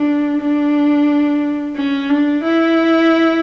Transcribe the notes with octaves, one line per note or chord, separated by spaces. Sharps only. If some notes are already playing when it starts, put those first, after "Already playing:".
Already playing: D4
D4
C#4
D4
E4